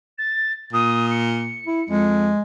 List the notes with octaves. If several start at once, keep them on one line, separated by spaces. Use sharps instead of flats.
A6
A#2 D#6
C#7
E4
F2 G#3